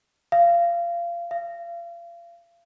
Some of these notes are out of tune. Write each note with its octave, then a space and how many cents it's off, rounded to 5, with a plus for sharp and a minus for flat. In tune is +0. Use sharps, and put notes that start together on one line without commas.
F5 -25
F5 -35